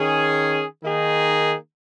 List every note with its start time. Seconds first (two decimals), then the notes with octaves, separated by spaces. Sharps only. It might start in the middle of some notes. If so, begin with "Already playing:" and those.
Already playing: D#3 C#4 G#4
0.83 D#3 A#3 D#4 G#4